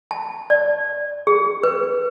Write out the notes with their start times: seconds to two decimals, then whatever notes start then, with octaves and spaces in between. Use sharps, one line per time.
0.11 A5
0.50 D5
1.27 G#4
1.63 B4